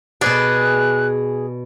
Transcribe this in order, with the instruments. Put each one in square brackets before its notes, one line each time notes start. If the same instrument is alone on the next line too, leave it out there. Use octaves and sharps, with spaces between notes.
[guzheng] B2 B4 D5 [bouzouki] G#4 [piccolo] F#6